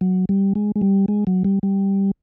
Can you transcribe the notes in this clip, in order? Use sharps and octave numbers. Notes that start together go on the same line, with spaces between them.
F#3
G3
G#3
G#3
G3
G#3
F#3
G3
G3